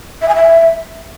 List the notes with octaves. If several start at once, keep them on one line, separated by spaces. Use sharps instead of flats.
E5
G#5
E5